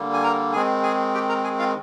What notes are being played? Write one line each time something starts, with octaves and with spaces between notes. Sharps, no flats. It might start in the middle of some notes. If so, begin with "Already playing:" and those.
Already playing: D3 G3 A#3
G#5
A#4 A#5
D#3 G#3 C4 G#4 G#5
G#4 G#5
G4 G5
A#4 A#5
G#4 G#5
F4 F5